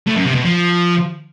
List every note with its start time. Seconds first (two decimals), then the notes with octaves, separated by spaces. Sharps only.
0.07 A2
0.16 F#2
0.25 C3
0.35 B2
0.44 F3